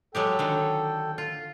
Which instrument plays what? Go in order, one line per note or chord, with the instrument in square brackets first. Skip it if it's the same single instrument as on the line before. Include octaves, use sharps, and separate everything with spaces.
[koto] F#3 G#3 G4 [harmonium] A4 G5
[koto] D3 D#3 F#3
F4